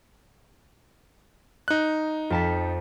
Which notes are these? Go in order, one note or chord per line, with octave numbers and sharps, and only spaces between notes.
D#4 F#6
F2 A5 B6